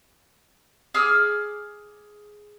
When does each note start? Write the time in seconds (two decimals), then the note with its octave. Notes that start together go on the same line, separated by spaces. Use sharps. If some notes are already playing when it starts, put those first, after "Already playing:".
0.94 G#4 D6 E6 F6